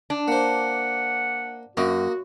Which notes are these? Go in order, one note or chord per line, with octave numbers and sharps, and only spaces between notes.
D4
A#3 C5 F#5
F#2 A#3 F#4 D#5